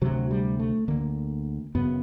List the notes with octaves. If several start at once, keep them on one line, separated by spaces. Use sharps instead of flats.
D2 C3 F#3
G3
A3
D2 D3 A#3
F#2 C#3 B3